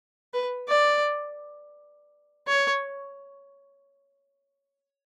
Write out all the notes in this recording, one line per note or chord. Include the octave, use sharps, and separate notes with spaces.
B4
D5
C#5